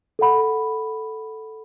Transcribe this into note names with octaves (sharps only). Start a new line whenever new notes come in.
A4 F#5 B5